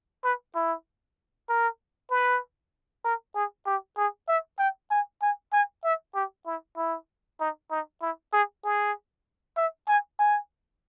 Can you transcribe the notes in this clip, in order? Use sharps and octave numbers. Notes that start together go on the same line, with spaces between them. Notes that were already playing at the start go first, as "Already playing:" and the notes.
B4
E4
A#4
B4
A#4
G#4
G4
G#4
E5
G5
G#5
G#5
G#5
E5
G4
E4
E4
D#4
D#4
E4
G#4
G#4
E5
G#5
G#5